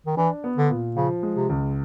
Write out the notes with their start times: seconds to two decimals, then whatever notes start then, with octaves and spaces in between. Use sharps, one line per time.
0.06 D#3
0.17 E3 D4
0.44 B3
0.57 D3
0.70 A#2
0.96 C#3 F3
1.23 G#3
1.36 C3
1.49 C#2